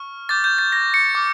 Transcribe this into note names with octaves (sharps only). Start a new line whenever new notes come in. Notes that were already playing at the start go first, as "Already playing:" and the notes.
Already playing: C#6 F6
D6 G6 A6
G6
A6
A#6
C#7
D6 F6